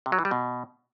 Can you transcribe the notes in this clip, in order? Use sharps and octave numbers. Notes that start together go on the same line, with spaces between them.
C3
F#3
E3
G3
B2